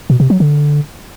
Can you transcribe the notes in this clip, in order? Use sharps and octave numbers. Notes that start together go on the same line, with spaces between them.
B2
C3
F#3
D3